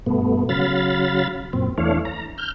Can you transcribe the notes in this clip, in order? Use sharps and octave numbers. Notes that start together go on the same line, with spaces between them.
G2 B2 A3 B3
C#3 F#3 F5 B5 A6
F#2 A#2 C4
E2 E3 A3 D4 C#5 F5
A#5
F6 G6